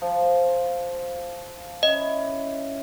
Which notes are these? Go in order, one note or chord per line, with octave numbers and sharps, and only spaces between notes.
F3
C#4 E4 D#5